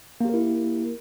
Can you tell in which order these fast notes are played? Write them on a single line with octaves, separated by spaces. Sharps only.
A#3 G4 A#4 E4